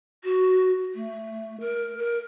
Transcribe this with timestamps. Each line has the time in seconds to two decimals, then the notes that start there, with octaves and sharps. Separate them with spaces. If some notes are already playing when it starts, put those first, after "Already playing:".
0.24 F#4
0.95 A3
1.60 A#4
1.98 A#4